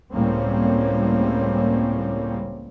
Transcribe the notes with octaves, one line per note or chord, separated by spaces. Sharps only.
C#2 A2 G3 A#3 C4 C#4